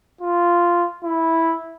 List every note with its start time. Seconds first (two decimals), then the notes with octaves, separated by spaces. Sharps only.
0.21 F4
1.04 E4